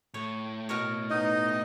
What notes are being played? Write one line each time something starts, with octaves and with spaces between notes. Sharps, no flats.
A2 C#5
B2 A#4 C#5
B3 D#4 D#5